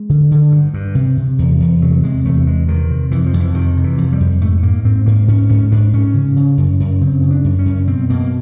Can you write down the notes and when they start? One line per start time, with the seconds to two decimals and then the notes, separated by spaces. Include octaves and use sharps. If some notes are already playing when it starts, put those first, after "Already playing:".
Already playing: G#3
0.10 D3
0.31 D3
0.52 G2
0.74 G2
0.95 C3
1.17 C3
1.38 E2
1.60 E2
1.82 C3 F#3
2.04 C3 G#3
2.25 E2 A3
2.47 E2 G#3
2.68 C3 D#3
2.90 C3
3.11 F2 E3
3.26 F3
3.34 F2
3.40 E3
3.55 C3 D#3
3.77 C3
3.84 E3
3.98 F2
4.12 G3
4.20 F2
4.41 G#2 A3
4.63 G#2 A#3
4.84 G#2 C4
5.06 G#2 A#3
5.28 G#2 C#4
5.49 G#2 C#4
5.72 G#2 D4
5.93 G#2 C#4
6.14 C#3
6.37 C#3
6.57 F#2
6.80 F#2
7.01 C#3 C4
7.22 C#3
7.31 D4
7.44 F#2
7.59 C#4
7.66 F#2
7.87 B2 C4
8.10 B2 A#3